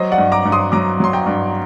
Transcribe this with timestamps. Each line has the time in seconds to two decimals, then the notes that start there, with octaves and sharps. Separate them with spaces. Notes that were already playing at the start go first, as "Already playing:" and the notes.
Already playing: F#3 C5 D#5
0.11 D5 F#5
0.18 G2
0.32 A#5 D6
0.45 G2
0.52 C6 D#6
0.72 F#3 A#5 D6
1.00 F#3 C6
1.13 G5 A#5
1.26 G2